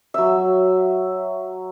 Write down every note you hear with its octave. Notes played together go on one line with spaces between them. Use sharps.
F#3 E5